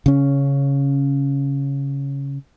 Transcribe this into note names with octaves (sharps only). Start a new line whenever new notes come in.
C#3 C#4